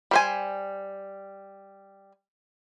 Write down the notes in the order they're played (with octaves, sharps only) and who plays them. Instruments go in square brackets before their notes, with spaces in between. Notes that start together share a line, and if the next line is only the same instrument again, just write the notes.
[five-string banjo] G3 C5 G#5